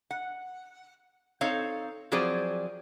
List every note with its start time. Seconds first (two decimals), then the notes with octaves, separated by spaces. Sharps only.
0.11 F#5
1.41 C4 D#4 A4 C#5 F5
2.12 F3 F#3 C4 G#4 C5 D5